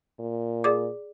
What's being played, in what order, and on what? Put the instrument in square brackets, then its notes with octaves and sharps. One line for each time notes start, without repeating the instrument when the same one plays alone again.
[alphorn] A#2
[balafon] G#4 D5 D6